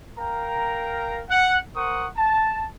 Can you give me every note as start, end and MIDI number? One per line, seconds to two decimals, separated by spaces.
0.18 1.23 70
0.18 1.23 77
0.18 1.23 79
0.18 1.23 82
1.30 1.58 78
1.76 2.07 70
1.76 2.07 72
1.76 2.07 78
1.76 2.07 85
1.76 2.07 87
2.17 2.67 81